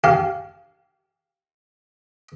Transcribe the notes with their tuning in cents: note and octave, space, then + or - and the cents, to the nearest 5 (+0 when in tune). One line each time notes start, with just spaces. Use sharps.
G4 -30 F5 -10